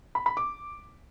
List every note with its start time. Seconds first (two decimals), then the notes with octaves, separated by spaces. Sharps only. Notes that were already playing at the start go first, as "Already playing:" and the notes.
0.15 B5
0.26 B5
0.37 D6